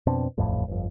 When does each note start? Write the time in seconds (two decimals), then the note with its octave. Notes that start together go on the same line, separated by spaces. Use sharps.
0.06 F2 B2 C4 D4
0.38 D#1 A1 F2 A2
0.68 G1 F2